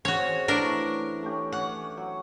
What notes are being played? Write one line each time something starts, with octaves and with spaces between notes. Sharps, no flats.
C4 C#4 F#4 G#4 C#5
E3 A3 D4 A#4
A3 C#4 G4
C#4 F#5
F#3